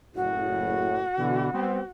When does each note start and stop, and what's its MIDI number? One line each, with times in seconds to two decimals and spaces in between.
0.15 1.03 30
0.15 1.03 45
0.15 1.88 66
1.18 1.51 47
1.18 1.51 50
1.18 1.51 52
1.53 1.79 55
1.53 1.79 59
1.53 1.79 60